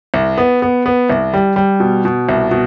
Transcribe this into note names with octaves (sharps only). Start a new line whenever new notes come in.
C2
B3
B3
B3
C2
G3
G3
B2
B2
C2
B2